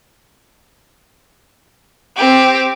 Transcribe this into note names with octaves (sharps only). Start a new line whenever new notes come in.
C4 G4